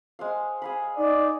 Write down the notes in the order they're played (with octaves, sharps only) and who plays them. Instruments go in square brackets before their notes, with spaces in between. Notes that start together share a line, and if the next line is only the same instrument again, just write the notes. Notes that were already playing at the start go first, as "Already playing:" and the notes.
[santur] G#3 C5 F5
G#4 F5 B5
[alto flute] D#4 [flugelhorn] D5